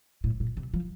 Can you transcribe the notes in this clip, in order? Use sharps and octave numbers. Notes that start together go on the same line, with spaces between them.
A2
A#2
C3
F3